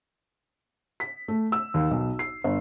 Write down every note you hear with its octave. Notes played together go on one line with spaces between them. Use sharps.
B6
A3
E6
D#2
B1
C7
G1